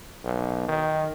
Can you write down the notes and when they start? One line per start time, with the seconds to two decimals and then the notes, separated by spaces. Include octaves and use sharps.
0.24 B1
0.68 D#3